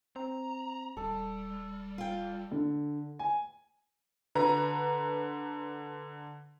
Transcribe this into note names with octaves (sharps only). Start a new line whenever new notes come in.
C4 A#5
D#1 G3 A4
F4 G5
D3
G#5
D3 B4 A#5